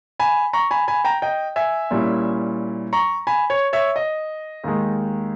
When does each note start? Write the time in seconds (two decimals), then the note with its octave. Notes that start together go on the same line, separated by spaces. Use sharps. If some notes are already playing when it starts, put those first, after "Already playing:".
0.19 G#5 B5
0.53 A#5 C#6
0.71 G#5 B5
0.88 G#5 B5
1.05 G5 A#5
1.22 D#5 G5
1.56 E5 G#5
1.91 A#2 G3 C#4 E4
2.93 A#5 C#6
3.27 G#5 B5
3.50 C#5
3.73 C#5 E5
3.96 D#5
4.64 D#2 D#3 G#3